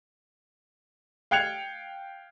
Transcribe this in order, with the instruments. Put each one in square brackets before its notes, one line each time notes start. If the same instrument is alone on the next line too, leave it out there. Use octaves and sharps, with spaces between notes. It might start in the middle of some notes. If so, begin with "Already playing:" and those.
[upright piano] F5 G5 F#6 G#6 C#7 F7